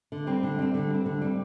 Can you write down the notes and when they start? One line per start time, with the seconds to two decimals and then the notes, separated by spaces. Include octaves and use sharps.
0.12 D3
0.27 G3 C4
0.43 D3
0.59 G3 C4
0.74 D3
0.90 G3 C4
1.06 D3
1.22 G3 C4